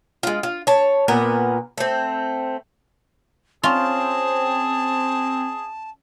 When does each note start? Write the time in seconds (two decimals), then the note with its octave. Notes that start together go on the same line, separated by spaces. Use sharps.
0.23 G#3 F4
0.43 F4
0.67 C#5 A5
1.08 A#2 B3 A#4
1.78 A3 C4
3.63 C4 C#4 F4 G#4 A5